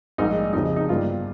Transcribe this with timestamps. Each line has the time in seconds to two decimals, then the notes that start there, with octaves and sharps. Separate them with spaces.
0.18 A#1 G#2 G3 A#3 D#4
0.53 F1 F2 C#3 D#4
0.76 D#4
0.88 G1 G2 G3 A#3 F4